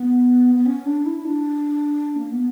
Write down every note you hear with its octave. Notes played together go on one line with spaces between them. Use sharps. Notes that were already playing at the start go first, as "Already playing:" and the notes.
Already playing: B3
B3
C#4
D4
E4
D4
A#3
B3